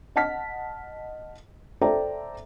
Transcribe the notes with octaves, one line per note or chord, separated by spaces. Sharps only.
D#5 F#5 A5 F6 B6
A4 C5 D5 E5 G5 A#5